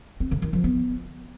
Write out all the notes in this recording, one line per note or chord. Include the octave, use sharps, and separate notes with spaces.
C4
C#3
D#3
F3
B3